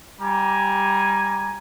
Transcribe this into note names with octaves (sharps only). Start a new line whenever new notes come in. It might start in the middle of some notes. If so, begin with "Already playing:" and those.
G3 G#5 A#5